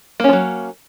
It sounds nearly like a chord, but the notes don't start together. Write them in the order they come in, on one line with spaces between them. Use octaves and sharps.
A#3 C#4 F3 F#3